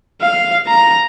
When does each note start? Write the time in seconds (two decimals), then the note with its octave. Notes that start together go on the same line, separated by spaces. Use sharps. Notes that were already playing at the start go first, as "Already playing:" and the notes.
0.21 F5
0.67 A#5